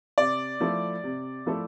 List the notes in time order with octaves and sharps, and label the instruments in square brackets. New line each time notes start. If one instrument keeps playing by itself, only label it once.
[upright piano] C3 [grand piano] D5
[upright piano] F3 A3 E4 A4
C3
F3 A3 E4 A4